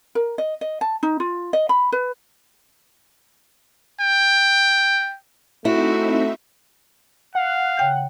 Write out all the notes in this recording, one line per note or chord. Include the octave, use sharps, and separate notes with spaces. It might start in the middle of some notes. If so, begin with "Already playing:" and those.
A#4
D#5
D#5
A5
D#4
F4
D#5
B5
B4
G5
A3 C4 D#4 E4 F#4 E5
F5 F#5
C#3 G5 G6